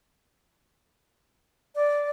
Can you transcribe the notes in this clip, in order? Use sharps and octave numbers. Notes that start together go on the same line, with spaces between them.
D5